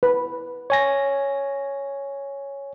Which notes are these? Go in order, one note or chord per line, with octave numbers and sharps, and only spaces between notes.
B4
C#5 G#5 A#6